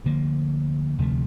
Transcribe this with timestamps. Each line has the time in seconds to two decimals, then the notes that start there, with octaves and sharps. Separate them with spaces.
0.04 D2 D3 F3 A#3
0.98 D2 C3 F3 A3